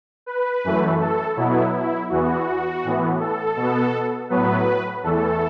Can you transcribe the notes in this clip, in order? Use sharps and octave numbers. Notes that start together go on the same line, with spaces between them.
B4
F#2 E3 A3
A4
B2 F#3 B3 E4
E4
E2 E3 B3 F#4
A2 E3 B3
A4
B2
B3
A2 F#3 B3 B4
E2 E3 A3 A4